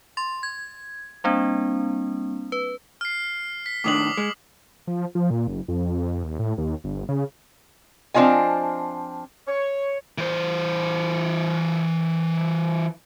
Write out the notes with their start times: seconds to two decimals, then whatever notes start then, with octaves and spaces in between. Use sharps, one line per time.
0.17 C6 A6
0.43 G#6
1.24 G3 A#3 C4 D4
2.52 B4
3.01 F6 C7
3.66 B6
3.84 A2 D#3 D4 D6 D#6 F#7
4.17 G#3
4.87 F3
5.15 F3
5.30 A#2
5.48 F#1
5.68 F2
6.24 D#2
6.39 A2
6.58 D#2
6.84 G1
7.09 C#3
8.14 F3 C4 D4 F4 D#5 G#5
9.47 C#5
10.18 E3 C5